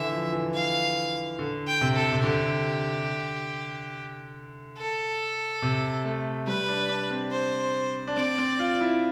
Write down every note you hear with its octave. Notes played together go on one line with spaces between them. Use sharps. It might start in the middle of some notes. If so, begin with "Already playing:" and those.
Already playing: D3 E3 E5
F3
E3
F5
D3
G5
C3
A4
C3
D3 G4
A4
C3
A3
G3 B4
D4
D4
C4
C5
D4
C4 D5
C4
F4
E4